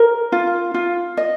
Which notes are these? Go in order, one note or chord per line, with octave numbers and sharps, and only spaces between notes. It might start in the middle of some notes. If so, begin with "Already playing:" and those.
Already playing: A#4
F4
F4
D#5